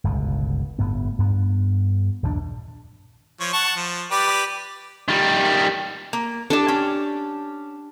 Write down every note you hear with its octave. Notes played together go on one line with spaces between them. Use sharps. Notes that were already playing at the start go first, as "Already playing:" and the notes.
G1 C#2 B2
G1 A2 B3
G2 B3
A#1 D#2 E3 D4
F3 C#5
F#5 A5 C#6
F3
G4 B4 D5
D#3 G3
A#3
D4 G4 A4 D5 A5
C#4